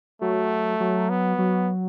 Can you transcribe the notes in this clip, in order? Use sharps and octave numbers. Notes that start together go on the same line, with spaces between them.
F#3 A3
F#3
B3
F#3